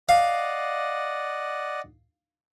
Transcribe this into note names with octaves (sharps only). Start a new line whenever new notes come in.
D5 D#5 F5 F#5